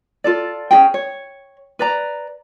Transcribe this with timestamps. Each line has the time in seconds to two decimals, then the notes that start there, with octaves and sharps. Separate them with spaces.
0.24 F4 A4 D5
0.71 C#4 D#4 G#4 G5
0.94 C#5
1.79 B4 D5 A#5